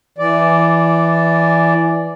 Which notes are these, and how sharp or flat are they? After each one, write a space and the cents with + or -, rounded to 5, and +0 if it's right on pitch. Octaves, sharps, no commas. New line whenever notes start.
E3 +10 D5 -5